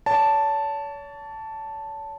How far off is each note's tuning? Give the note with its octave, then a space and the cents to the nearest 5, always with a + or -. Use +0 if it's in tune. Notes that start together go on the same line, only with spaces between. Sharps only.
C#5 +40 A5 +0